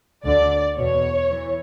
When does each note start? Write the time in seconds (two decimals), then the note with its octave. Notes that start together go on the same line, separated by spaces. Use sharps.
0.26 D2 D3 D5
0.78 E2 B2 C#5
1.31 E3